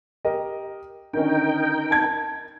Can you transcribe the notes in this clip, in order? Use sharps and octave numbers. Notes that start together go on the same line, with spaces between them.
G4 A#4 D#5
D3 D#3 C#4 D#4 A#4 G5
A5 G#6